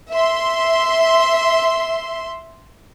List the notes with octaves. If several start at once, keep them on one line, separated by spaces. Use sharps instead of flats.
E5 C6